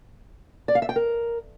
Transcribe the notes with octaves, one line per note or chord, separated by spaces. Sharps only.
D5
F5
E5
G5
A#4